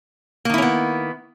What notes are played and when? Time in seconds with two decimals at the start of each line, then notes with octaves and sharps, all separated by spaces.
0.45 A#3
0.50 D#3
0.54 E4
0.58 C#4
0.62 B3